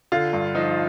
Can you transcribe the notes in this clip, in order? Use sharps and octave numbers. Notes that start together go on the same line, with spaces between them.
D3 F4
G2
F3 D#4